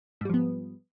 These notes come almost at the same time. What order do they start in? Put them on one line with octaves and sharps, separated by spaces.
G#2 G3 F3 B3